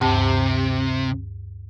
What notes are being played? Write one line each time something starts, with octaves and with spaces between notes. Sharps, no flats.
D2 G2 C3 A5